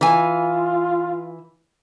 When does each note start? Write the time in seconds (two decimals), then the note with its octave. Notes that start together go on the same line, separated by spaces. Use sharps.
0.01 E3 F4 G#5